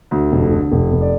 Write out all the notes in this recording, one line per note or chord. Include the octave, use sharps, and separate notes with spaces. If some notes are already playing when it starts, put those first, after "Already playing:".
D2
F1
D3
F1
F1
D5